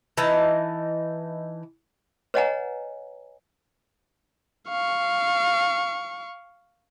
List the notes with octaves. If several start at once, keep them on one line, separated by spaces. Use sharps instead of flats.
E3 D#4 A5 A#5
B4 C#5 D#5 F#5 G#5 A#5
F5 C#6